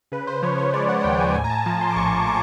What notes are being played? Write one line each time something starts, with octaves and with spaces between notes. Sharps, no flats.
C#3 B4
C5
F3 C#5
C#5
G#3 D5
F#5
F#5
D#2 G5
G#5
A2 G#5
A#5
A5
F3 A5
C6
D6
A#1 C#6
D6